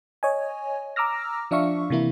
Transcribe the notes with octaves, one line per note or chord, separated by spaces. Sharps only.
C#5 D#5 G#5
A#5 D6 E6 F6 A#6
F3 D4 E5 F5 C#6
C3 E3 A#3 E4